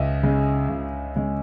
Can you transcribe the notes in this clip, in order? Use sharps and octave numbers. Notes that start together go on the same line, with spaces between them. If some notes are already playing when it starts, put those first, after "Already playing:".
Already playing: C#2 D#5 E5
C#3 G#3
C#2
C#3 G#3